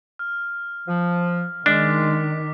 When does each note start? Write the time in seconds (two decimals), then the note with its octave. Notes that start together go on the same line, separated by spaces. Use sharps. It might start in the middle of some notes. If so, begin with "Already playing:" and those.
0.19 F6
0.87 F3
1.66 D#3 G#3 D4 D6 F6 B6